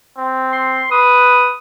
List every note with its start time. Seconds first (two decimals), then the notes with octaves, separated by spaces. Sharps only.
0.17 C4
0.52 C6
0.91 B4 D#6